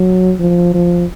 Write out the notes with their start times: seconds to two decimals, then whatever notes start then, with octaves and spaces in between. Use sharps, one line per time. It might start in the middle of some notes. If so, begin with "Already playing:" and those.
Already playing: F#3
0.39 F3
0.74 F3